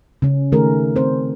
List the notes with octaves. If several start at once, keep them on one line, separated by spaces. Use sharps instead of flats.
C#3 C#4
D#3 A3 G#4 A#4
C4 C5